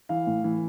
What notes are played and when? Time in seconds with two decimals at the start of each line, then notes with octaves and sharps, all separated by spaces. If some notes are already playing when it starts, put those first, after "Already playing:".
0.09 E3 F5
0.27 A2
0.44 E3